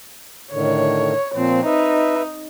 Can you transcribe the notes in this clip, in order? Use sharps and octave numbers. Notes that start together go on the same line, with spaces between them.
A2 D3 D#3 C#5
A#2 F3 C4
D#4 B4 E5